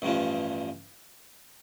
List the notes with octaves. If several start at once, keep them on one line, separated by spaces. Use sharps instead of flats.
A1 G2 F3